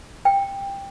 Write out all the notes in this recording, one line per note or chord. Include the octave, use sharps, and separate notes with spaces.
G5